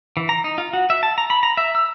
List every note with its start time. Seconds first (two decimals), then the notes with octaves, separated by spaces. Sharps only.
0.17 E3
0.29 A#5
0.44 D#4
0.58 F4
0.73 F#4
0.90 E5
1.03 A5
1.18 A#5
1.30 B5
1.43 A#5
1.57 E5
1.75 E6